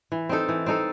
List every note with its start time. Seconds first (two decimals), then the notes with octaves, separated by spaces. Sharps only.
0.12 E3
0.29 C4 D#4 A4
0.49 E3
0.66 C4 D#4 A4